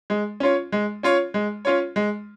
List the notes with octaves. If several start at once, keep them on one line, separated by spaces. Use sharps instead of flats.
G#3
C#4 F4 C#5
G#3
C#4 F4 C#5
G#3
C#4 F4 C#5
G#3